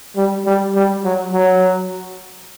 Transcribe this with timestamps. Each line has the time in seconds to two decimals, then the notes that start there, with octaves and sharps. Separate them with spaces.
0.16 G3
0.46 G3
0.75 G3
1.04 F#3
1.33 F#3